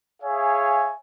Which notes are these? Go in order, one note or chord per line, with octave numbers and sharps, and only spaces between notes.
G#4 C#5 E5 F5 G#5